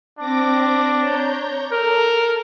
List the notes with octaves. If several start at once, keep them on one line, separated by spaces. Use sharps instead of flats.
C4 D4 D6 A#6
C#5 A#5 G6
A4 A#4